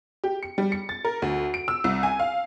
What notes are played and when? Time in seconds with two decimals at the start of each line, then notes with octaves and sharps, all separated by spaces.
0.24 G4
0.43 C#7
0.58 G3
0.72 C#7
0.89 A6
1.05 A#4
1.22 D2
1.54 D7
1.68 E6
1.84 C2
2.03 G#5
2.20 F5